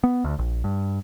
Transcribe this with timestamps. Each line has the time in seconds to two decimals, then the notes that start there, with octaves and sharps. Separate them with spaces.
0.04 B3
0.24 D2
0.39 A#1
0.64 G2